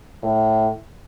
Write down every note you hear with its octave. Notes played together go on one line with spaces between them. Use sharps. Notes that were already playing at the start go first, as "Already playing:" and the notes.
A2